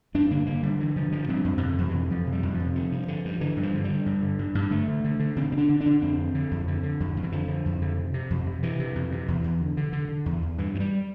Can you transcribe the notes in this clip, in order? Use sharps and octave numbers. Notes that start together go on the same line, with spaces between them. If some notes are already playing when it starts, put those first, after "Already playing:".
G2 D4
D3 A#3
D3 A#3
D3 G3
G2 E3
D3 F3
G2 F3
G2 C4
F2 C4
C3
D3
F2 F3
E3
C3
F2 F3
C3
G3
F2
F3
C3
D3
G2
D3
G2
D3 E3
G2
F3
D3
D3 G3
G2
D3
G2
G2
D3 A3
D3
D3
D3
D3 C4
D3 C4
D4
D3
D4
D3
F2 C4
D3
D3
F2
D3
D3
F2
F2
E3
D3 F3
D3
F2
D3
C3
C3
F2
C3
C3 E3
C3
F2
C3
E2
E2
D3
D3
D3
D3
E2
E2
G2 E3
G2
G3